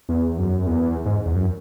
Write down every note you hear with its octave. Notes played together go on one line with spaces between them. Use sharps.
E2
F#2
E2
G#2
E2
F#2